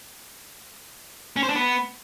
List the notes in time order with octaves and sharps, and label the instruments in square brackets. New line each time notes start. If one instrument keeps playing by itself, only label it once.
[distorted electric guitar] C#4
C5
D4
B3